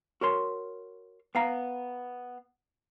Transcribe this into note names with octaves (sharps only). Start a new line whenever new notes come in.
F#4 A#4 C#5 C6
B3 F5 A#5